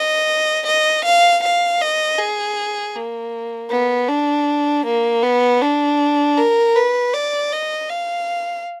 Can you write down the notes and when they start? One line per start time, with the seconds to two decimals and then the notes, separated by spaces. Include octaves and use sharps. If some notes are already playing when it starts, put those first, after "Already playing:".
Already playing: D#5
0.67 D#5
1.05 F5
1.43 F5
1.81 D#5
2.18 G#4
2.96 A#3
3.71 B3
4.09 D4
4.86 A#3
5.23 B3
5.62 D4
6.38 A#4
6.76 B4
7.14 D5
7.53 D#5
7.90 F5